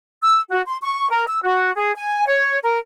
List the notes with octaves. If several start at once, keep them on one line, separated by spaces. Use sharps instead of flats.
E6
F#4
C6
C#6
A#4
E6
F#4
G#4
G#5
C#5
A#4